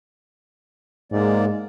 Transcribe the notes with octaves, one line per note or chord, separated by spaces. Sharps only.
G#2 G#3 A#3 D5